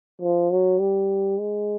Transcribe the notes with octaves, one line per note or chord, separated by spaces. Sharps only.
F3
F#3
G3
G#3